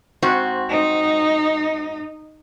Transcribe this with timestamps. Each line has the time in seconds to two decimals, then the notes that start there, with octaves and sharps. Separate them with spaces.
0.22 G#2 C4 F#4
0.70 D#4